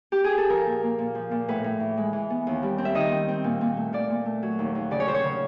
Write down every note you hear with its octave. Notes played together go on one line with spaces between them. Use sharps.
G4
G#4
A4
F3 A#4
A#2
A#3
A#2
F3
A#2
A2 B4
A2
E3
G#3
E3
B3
D#2
G3
C4
E5
D#3 D#5
C4
C4
A#2
A#2
A3
A#2 D5
A#2
A3
F#3
D#2
D#2
C#3 D5
C#5
F#3 C5
C#5
C#3